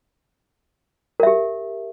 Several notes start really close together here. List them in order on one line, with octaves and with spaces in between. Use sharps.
A#4 E5 G4